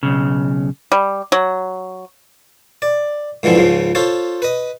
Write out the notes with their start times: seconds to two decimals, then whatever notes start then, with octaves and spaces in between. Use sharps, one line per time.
0.03 B1 C#3
0.92 G3
1.32 F#3
2.82 D5
3.43 G#2 D3 E3 F3 C4
3.55 C#2 G#2 C#3 F3
3.95 F4 A4 C5 C#5
4.42 B4 D#5